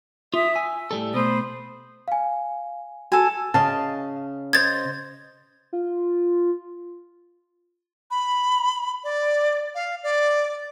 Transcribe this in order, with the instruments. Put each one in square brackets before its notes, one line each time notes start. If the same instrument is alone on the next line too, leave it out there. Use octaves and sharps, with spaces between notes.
[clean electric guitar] F4 [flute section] E5 D#6
[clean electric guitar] G#5 [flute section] E6
[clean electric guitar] A2 G3 A4
[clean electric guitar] B2 A3 [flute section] C5 B5 D#6
[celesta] F5 G#5
[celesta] F#4 [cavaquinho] A4 G#5
[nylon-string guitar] C#3 [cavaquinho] D#5 F5 A5
[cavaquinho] C5 D#5 [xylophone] G#6 A6
[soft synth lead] F4
[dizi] B5
D5
F5
D5